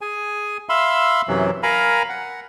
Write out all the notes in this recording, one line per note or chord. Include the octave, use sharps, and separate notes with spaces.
G#4 G#5
E5 F5 B5 C6 E6
F#2 C3 E3 F#3
A#4 F5 G#5 A#5 B5
F#5